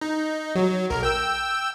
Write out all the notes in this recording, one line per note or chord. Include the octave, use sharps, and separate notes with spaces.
D#4
F#3
B1 A#4
G5 E6